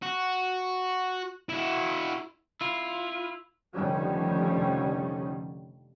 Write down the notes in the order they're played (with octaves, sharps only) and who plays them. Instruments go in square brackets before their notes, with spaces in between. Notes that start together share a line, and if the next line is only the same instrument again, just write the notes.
[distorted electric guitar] F#4
E4 F#4
[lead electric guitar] E4 F4
[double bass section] F1 D3 D#3 F3 G3 C#4